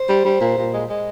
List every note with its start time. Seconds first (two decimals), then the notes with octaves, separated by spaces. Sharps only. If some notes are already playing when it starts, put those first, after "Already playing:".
Already playing: C5
0.09 G3
0.24 G3
0.41 A#2
0.57 A#2
0.72 G#3
0.89 G#3